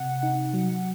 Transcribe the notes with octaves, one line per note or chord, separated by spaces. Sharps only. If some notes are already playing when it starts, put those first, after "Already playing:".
Already playing: C3 F#5
D#4
F#3